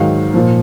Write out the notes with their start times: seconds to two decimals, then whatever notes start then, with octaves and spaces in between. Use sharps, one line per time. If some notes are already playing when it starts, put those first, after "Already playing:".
Already playing: G#2 D#3 F#3 F5
0.34 A#2 F3